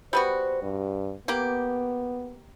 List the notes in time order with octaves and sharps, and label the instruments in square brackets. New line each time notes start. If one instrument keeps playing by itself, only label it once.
[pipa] G3 B3 F#4 [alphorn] C5
[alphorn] G2
[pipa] A#3 G4 [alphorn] B3